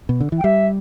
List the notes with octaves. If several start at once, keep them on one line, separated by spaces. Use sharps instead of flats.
B2
D3
E3
G5
G3 E5